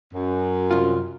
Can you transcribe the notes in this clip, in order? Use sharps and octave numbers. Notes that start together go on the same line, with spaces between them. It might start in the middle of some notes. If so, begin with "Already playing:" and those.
F#2
C2 F4